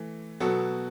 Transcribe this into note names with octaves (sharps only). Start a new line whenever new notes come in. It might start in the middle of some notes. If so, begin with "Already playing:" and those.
Already playing: E3 A3
B2 F#3 B3 F#4 A4